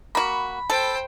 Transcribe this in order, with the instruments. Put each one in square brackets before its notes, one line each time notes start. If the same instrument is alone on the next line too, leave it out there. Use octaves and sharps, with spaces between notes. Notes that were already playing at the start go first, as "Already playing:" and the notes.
[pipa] A#3 F#4 [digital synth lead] B5
[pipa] A4 [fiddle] C5 G5